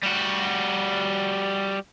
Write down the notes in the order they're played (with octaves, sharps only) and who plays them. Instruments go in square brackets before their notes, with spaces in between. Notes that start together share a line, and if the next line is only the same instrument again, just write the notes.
[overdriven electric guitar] G3 F#4